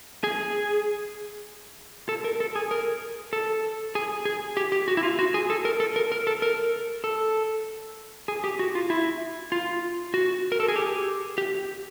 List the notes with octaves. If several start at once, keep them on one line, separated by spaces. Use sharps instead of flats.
G#4
A4
A#4
A4
G#4
A#4
A4
G#4
G#4
G4
G4
F#4
E4
F4
F#4
G#4
A4
A#4
A4
A#4
A#4
A4
A#4
A4
G#4
G4
F#4
F4
E4
F4
F#4
A#4
A4
G#4
G4
G4